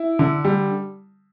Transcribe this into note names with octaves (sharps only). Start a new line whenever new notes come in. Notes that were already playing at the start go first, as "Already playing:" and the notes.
Already playing: E4
D3
G3